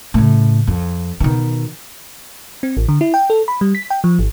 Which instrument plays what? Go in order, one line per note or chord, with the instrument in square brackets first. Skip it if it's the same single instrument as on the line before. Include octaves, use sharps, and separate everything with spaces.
[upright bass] A2 C#3
F2
B2 D#3
[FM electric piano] C4
A1
D3
E4
G5
A4
B5
G3
B6
G5
F3
G#1